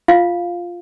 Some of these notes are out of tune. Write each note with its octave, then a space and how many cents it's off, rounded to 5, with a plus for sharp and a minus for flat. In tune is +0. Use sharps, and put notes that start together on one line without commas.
F4 +0 F5 +0